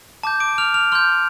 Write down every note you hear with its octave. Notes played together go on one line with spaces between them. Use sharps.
A5 D6 G6
D6 D7
F6 F7
F6 F7
C6 F6 G6 F7